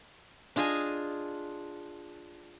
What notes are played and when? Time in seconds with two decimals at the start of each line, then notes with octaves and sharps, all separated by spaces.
0.56 D4 F4 G#4 D#5 G#5